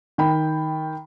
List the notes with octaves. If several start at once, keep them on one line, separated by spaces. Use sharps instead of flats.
D#3 G5 B5